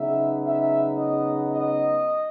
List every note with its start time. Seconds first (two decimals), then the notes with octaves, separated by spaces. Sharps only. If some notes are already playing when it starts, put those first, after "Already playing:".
Already playing: C#3 F#3 B3 D#4 E5
0.43 E5
0.96 D#5
1.50 D#5